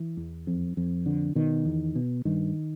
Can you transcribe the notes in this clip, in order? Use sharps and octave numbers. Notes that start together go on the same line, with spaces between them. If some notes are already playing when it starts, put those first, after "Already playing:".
Already playing: E3
E2
F2
F2
D3
B2 D#3
E2
B2
G2 D#3